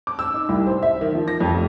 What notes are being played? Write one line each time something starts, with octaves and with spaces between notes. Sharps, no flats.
D6
E6
D#4
C2
C5
E5
D#3
F3
A#6
F2
F1